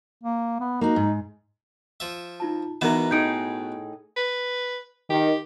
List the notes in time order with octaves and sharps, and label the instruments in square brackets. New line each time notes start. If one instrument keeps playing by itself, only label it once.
[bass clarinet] A#3
B3
[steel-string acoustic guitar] A#3 F#4 [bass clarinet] D#4
[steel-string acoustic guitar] G#2
[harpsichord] F3 E5
[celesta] D#4 F4 A5
[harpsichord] B2 B3 [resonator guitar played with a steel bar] E3 A#4 [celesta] D#4 E5 E7
[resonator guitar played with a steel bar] A2 D#4 G#4 [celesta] G6 D7
[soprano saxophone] B4
[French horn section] D#3 [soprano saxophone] G4